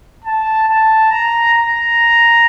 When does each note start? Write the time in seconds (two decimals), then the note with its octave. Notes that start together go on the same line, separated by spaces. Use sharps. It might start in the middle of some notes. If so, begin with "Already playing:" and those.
0.24 A5
0.67 A5
1.10 A#5
1.54 A#5